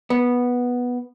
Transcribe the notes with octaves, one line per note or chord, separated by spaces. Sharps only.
B3